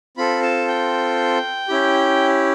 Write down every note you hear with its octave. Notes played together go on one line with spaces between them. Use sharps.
C4 F4 A4 B5
A5
G5
C#4 E4 G4